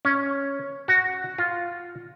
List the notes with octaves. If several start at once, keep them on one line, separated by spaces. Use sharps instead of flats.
C#4
F#4
F4